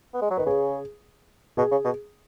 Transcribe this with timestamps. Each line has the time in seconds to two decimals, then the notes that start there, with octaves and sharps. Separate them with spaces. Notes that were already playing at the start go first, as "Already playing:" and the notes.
0.14 B3
0.22 G#3
0.30 F#3
0.37 D#3 B4
0.46 C#3 G#4
1.57 B2 G#4
1.71 C#3
1.85 B2